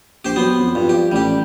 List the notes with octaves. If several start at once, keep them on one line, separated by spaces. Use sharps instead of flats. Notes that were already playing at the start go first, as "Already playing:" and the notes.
A#1 G4 C5
F#3 B3 C6
F2
G2 F3
G4
A1 G3 G4